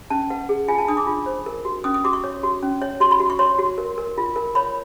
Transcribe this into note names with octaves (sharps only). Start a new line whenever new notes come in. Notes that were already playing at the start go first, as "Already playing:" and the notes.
C#4 A5
B4 F#5
G#4
F4 G#5
A5
D4 D#6
D6
F4
C5
A#4
F#4
C#4 D#6
D#6
F#4 D6
C#6
C#5
F#4
C#4
C#5
F#4 C6
B5
F#4
C#6
C#5 C6
F#4
A#4
A#4
F4
A#4
C#5 B5